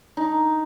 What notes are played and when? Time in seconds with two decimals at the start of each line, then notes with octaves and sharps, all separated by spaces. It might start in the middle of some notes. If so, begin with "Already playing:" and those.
0.17 D#4